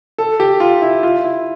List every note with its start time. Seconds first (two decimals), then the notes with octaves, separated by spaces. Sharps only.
0.18 A4
0.40 G4
0.60 F4
0.82 E4
1.03 F4
1.24 E4